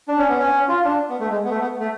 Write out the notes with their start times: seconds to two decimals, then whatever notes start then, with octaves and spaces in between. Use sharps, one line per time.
0.08 D4
0.18 C#4
0.28 B3
0.38 C#4
0.69 F4
0.84 D4
1.09 B3
1.20 A3
1.30 G#3
1.44 B3
1.50 A3
1.60 B3
1.80 A3